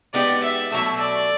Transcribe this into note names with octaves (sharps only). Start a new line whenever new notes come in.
G#3 B3 D#4 G4 D5
E5
B2 F#3 A3 E5
D5